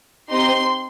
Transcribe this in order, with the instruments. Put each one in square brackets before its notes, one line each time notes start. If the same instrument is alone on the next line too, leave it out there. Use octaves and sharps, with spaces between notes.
[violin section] C4 D#4 G4 C6